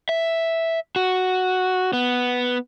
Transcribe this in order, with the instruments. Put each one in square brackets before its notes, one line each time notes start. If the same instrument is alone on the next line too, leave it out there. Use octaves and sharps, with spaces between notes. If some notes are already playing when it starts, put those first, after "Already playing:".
[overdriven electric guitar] E5
F#4
B3